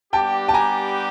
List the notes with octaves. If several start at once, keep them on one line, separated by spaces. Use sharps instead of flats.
G3 B3 D4 G4 G5 A5
A5
G#5 A#5